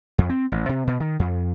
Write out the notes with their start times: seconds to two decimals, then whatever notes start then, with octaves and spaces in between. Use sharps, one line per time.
0.18 F2
0.29 C4
0.52 A1
0.69 C3
0.87 B2
1.00 D#3
1.19 F2